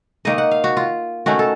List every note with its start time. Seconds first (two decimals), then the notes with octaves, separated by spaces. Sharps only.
0.25 D#3 A#3 D#4 D#5
0.38 F#5
0.51 F5
0.64 F#4
0.77 F4
1.26 D#3 A3 C#4 F#4
1.39 A4